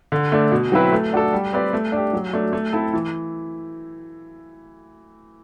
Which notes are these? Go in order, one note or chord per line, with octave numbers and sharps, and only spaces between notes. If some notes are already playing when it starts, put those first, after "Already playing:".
D3
A3 D4
B2
F#3 C4 E4 B4
A3
D4 F#4 A4
G3
C4 G4 B4 D5
A3
D4 G4
F#3
A3 D4
A3
C4 E4 A4
E3